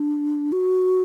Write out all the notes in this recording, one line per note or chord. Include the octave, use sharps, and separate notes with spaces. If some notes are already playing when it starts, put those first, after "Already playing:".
Already playing: D4
F#4